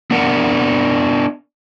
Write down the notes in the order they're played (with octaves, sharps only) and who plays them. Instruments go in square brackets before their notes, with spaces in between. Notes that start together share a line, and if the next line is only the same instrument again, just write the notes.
[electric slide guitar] B3 D4 A#4 F#5